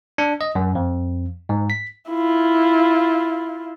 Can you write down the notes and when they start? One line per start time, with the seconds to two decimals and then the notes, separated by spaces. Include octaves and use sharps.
0.18 D4
0.41 D#5
0.55 F#2
0.75 F2
1.49 G#2
1.70 B6
2.10 E4 F4